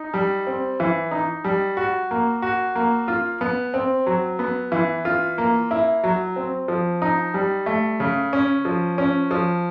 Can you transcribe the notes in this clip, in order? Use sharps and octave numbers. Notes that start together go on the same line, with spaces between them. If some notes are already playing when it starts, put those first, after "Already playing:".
Already playing: D#4
G3
C4
E3
D#4
G3
F#4
A#3
F#4
A#3
F4
B3
C4
F#3
B3
E3
F4
A#3
E4
F#3
C4
F3
D#4
G3
A3
C#3
C#4
F3
C#4
F3